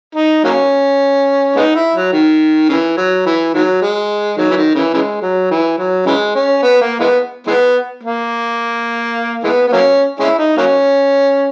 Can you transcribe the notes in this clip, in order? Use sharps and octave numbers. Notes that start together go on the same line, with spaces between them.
D#4
F#3 A#3 C#4
G#3 B3 D#4
E4
F#3
D#3
C#3 E3
F#3
E3
D#3 F#3
G#3
D#3 F#3
E3
D#3
C#3 E3
C#3 E3 G#3
F#3
E3
F#3
C#3 E3 G#3
C#4
B3
A#3
E3 G#3 B3
E3 G#3 B3
A#3
E3 G#3 B3
B3
F#3 A#3 C#4
G#3 C#4 E4
D#4
F#3 A#3 C#4